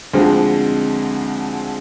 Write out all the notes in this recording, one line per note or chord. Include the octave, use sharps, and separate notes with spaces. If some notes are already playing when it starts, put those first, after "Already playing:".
D2 D3 F3 G#3 C4